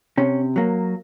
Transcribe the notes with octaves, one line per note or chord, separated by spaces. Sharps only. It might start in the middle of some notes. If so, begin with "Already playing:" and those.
C3 C#4
F#3 A#3